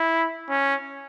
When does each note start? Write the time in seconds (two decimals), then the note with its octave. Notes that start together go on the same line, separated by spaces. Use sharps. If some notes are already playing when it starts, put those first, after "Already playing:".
Already playing: E4
0.49 C#4